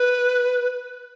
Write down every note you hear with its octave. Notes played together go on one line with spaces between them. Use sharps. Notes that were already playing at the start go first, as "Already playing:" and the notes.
Already playing: B4